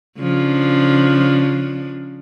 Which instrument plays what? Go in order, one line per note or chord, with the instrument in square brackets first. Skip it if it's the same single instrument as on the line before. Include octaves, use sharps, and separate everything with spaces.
[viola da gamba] C#3 F3 D4